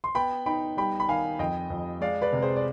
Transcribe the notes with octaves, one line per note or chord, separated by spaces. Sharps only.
C6
B3 G5 B5
D#4 G5 B5
G3 G5 B5
B5
D#3 F5 G#5
F2 D#5 G5
F2
G#3 D5 F5
B4 D5
C3
G#4 C5
D5